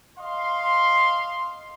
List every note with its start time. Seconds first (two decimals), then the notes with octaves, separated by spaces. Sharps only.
0.18 D#5 F5 C6